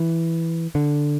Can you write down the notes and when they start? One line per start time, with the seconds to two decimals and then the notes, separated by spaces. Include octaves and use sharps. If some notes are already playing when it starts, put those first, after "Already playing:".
Already playing: E3
0.75 D3